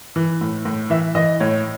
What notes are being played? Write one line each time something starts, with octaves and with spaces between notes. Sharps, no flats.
E3
A2
A2
E3 E5
E3 D#5
A2 C#5